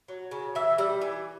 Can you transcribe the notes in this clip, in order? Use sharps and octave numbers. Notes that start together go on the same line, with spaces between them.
F#3
C#3
E3 E5
G3
E3